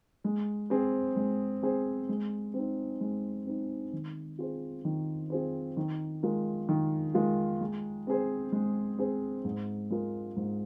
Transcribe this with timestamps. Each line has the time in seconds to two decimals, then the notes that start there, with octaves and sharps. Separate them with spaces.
0.24 G#3
0.70 C4 G#4 C5
1.16 G#3
1.63 C4 G#4 C5
2.09 G#3
2.54 C4 D#4
3.01 G#3
3.46 C4 D#4
3.93 D#3
4.38 C4 F4 G#4 C5
4.85 D#3
5.30 C4 F4 G#4 C5
5.77 D#3
6.23 G#3 F4 A#4
6.69 D#3
7.14 G#3 F4 A#4
7.61 G#3
8.07 C4 G#4 C5
8.52 G#3
8.99 C4 G#4 C5
9.45 G#2
9.90 G#3 F4 A#4
10.36 G#2